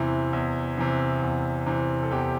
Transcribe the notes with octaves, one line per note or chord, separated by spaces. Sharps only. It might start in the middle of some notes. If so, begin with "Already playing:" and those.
Already playing: E2 C3 E3 E4
E2
C3 E3
E2
C3 E3
A4
E2 G4